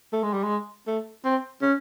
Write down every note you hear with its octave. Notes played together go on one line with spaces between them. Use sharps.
A3
G#3
G3
G#3
A3
C4
C#4